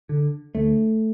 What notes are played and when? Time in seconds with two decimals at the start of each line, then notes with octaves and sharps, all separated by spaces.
0.09 D3
0.55 D2 A3